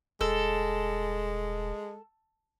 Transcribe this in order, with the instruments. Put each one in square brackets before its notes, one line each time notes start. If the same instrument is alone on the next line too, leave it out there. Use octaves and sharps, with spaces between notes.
[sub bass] D#1 [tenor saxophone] G#3 [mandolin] A4